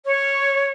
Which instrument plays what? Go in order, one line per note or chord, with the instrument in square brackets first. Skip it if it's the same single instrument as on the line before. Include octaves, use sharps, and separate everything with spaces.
[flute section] C#5